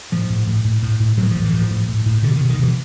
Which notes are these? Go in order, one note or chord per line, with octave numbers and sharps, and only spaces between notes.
A2 F3
A2
A2
A2
A2
A2
A2 F#3
A2 F3
E3
A2
F3
A2
A2
A2
B2 D3
D#3
B2
D#3
B2 E3